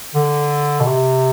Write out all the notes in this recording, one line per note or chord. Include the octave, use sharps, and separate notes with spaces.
D3
B2
C3